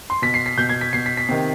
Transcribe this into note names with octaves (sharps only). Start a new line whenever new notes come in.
C6
B2 B6
C7
B6
B2 G6
G#6
B6
B2 C7
B6
B6
C3 D#3